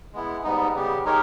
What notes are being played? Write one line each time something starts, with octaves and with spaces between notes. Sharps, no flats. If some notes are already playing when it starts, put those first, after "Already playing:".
G#3 B3 E4
G#2 G3 B3 D#4
C#3 G3 B3 G4
G#3 D#4 G4 A#4 C#5